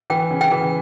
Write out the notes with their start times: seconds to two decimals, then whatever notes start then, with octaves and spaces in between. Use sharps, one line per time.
0.10 E3 G5
0.31 C#3
0.41 G5
0.51 E3